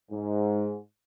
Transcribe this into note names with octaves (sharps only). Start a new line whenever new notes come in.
G#2